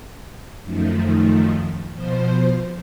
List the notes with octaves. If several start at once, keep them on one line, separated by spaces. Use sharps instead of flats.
F#2 D#3 F3 A3
B2 F3 C5